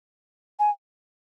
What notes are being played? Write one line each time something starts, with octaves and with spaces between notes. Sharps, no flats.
G#5